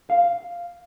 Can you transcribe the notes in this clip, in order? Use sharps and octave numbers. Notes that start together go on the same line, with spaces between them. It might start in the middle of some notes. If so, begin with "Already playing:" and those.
F5